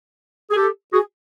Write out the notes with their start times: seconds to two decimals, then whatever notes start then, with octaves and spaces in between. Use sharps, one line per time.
0.50 G#4
0.55 G4 A4
0.92 F#4 G#4